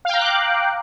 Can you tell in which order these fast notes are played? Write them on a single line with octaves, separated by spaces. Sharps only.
F5 G5 A#5 F#6 D6